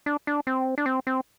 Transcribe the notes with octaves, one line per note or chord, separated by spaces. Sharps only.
D4
D4
C4
D4
C4
C4